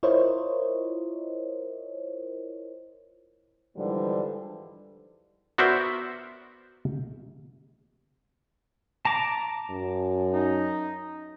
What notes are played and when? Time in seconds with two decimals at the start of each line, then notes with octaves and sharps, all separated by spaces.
0.03 E4 F4 A#4 C5 C#5 D#5
3.76 G#2 D3 E3 F3 G3
5.58 B3 F#4 A#4 C5 D5 E5
9.05 A5 A#5 D6
9.70 F#2
10.31 D#4